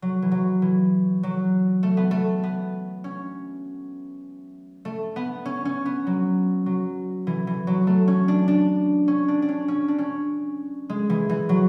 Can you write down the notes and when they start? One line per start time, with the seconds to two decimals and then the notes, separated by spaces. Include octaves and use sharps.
0.02 F#3
0.22 E3
0.32 F#3
0.62 E3
1.23 F#3
1.83 A3
1.97 B3
2.11 A3
2.44 B3
3.04 C#4
4.85 A3
5.16 B3
5.45 C#4
5.65 C#4
5.85 B3
6.07 F#3
6.66 F#3
7.27 E3
7.47 E3
7.67 F#3
7.87 A3
8.08 C#4
8.28 D4
8.48 D4
9.08 C#4
9.28 D4
9.42 D4
9.49 C#4
9.68 C#4
9.88 D4
9.98 C#4
10.89 G#3
11.10 E3
11.29 E3
11.49 F#3